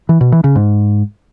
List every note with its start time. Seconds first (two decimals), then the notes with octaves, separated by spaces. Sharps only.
0.09 E3
0.21 B2
0.32 E3
0.44 C#3
0.56 G#2